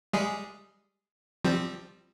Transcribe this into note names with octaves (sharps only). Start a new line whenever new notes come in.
G3 G#3 G#4
F3 G3 C4